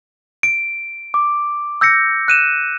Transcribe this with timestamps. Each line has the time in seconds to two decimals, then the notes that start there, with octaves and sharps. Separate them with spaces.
0.43 D7
1.14 D6
1.81 E6 G6 A#6 C#7
2.28 F#6 D#7 E7